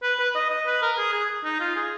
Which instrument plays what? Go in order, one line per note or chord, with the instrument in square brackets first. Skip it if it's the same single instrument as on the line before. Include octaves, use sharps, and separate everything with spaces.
[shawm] B4
B4
D#5
D#5
B4
A#4
G#4
G#4
D#4
F4
G#4